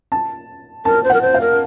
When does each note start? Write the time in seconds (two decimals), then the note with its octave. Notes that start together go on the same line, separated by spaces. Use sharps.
0.12 A5
0.85 A#4 A5
1.04 C5
1.10 A#4 F#5
1.22 C5
1.34 F5
1.41 A#4